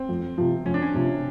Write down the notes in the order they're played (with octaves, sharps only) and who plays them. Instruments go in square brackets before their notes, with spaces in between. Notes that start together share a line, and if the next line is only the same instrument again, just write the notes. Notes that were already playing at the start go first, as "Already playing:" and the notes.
Already playing: [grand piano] C4
[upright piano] F2
C3 F3
[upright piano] F2 [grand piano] C#4
[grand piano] D4
C#4
[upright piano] C3 F3